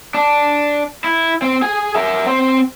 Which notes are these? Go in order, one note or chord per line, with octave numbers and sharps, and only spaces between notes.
D4
E4
C4
G#4 G#5
A#4 E5
C4 C5